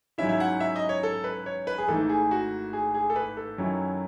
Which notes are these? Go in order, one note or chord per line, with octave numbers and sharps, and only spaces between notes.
G#2 F#3 C#4 E4 E5
E5
F#5
E5
D#5
C#5
A4
B4
C#5
B4
G#4
G#1 G#2 E3 A3 A4
G#4
F#4
G#4
G#4
A4
B4
A4
F#2 D#3 F#3 C#4 E4